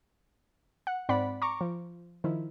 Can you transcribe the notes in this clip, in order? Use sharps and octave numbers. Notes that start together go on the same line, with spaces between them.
F#5
G#2 C4 D5 F#5 B5
A#5 C#6 D6
F3
D#3 F3 E4